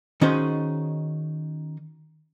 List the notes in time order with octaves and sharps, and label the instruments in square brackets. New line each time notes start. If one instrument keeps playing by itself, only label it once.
[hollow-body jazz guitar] D#3 C#4 D#4 F#4 G#4 C5